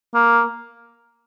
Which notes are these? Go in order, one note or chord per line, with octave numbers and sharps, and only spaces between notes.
A#3